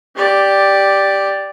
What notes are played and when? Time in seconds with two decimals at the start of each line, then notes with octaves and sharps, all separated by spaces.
0.16 G4 D5